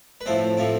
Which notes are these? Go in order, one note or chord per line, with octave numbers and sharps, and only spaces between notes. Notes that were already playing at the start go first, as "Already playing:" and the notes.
B4
A2 F3 A3 C4 C5
A2 F3 A3 C4